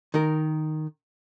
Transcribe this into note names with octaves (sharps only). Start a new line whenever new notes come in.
D#3 A#4